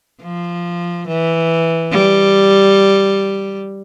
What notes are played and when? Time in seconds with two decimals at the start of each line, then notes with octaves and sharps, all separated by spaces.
0.22 F3
1.08 E3
1.91 G3